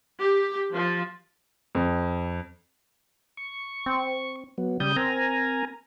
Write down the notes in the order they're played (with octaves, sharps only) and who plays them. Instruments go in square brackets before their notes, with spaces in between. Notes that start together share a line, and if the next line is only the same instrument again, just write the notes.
[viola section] G4
F3
[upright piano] F2
[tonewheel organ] C#6
[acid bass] C4
[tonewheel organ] F#3 B3
[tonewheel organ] C#3 D#6 G6 [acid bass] G3
[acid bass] C4 [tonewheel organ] A#4 G#5 A#5